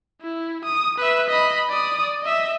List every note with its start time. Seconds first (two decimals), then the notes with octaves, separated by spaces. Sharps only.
0.22 E4
0.65 D#6
0.98 B4 E5
1.29 D#5 B5
1.69 D5 D#6
2.21 D#5 E5